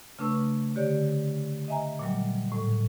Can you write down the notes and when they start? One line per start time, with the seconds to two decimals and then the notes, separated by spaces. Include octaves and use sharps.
0.19 C#3 A3 D4 B4 C#6 E6
0.76 D3 G4 C#5 D5
1.68 D#5 E5 G#5 A#5
1.99 A#2 F#3 G3
2.52 A2